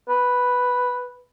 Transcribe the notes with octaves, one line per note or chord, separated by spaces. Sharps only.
B4